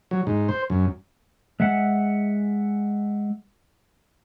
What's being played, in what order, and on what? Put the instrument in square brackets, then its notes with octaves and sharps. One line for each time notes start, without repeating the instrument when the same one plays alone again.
[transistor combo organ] F#3
G#2
C5
F#2
[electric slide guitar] G#3 E5 F#5